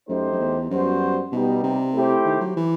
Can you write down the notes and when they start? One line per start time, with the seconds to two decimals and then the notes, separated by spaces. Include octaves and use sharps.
0.09 F#2 A3 D#4 G4 C5
0.32 F#2
0.39 E2
0.70 F#2 G3 B3 F#4 C5
1.32 B2 G3 B3 D#4 G4
1.63 C3
1.94 A3 E4 G4 C5
2.25 D#3
2.41 F#3
2.56 E3